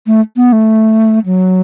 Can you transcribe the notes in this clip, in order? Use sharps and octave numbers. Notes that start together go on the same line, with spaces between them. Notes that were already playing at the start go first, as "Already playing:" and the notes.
A3
B3
A3
F#3